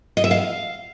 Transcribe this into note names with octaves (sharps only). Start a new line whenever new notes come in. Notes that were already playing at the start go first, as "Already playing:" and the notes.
D#5
E5
F5